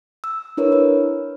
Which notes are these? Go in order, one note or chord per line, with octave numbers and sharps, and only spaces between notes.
E6
D4 E4 A#4 B4 C#5
B4